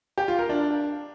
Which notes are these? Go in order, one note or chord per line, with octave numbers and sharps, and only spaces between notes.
G4
F4
A#4
D4